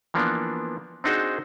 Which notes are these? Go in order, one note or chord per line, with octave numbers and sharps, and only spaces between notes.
E3 F3 A#3 B3 D4
C4 D4 D#4 F#4 G#4 C5